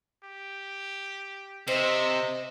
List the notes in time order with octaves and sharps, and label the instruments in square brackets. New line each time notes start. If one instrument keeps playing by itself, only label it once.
[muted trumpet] G4
[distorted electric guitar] C3 [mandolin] C5 [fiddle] D#5 [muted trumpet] E5